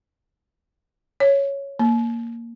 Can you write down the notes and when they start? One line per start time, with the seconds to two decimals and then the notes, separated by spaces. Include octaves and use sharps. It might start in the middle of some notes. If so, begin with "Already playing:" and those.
1.20 C#5
1.79 A#3